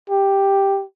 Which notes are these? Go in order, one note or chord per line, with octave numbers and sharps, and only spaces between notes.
G4